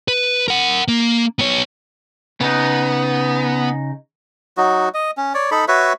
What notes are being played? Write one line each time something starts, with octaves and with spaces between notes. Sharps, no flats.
B4
A#4 F#5
A#3
B3 C#5
C#3 B3 D#4
F#3 D#4 F#4
D#5
C#4
C#5 D5
D#4 A4 B5
F#4 B4 C#5 E5